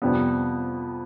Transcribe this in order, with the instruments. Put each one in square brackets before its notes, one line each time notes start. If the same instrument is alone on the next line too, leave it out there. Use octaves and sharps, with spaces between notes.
[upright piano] F2 C3 G3 B3